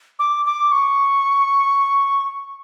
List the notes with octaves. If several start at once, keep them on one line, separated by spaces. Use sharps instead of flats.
D6
D6
C#6